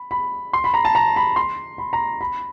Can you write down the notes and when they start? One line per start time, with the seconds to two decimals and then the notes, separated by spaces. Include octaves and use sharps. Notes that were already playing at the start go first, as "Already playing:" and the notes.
Already playing: B5
0.11 B5
0.53 C6
0.64 B5
0.74 A#5
0.85 A5
0.95 A#5
1.16 B5
1.36 C6
1.78 B5
1.93 A#5
2.21 B5